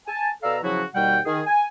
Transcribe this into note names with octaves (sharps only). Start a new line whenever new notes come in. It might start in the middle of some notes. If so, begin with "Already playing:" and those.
G#5 A5
B2 A4 D5 F5 A#5 E6
C#3 F3 F#3 E4 F#4
D#2 B2 G3 F#5 G5
D#3 G#4
G#5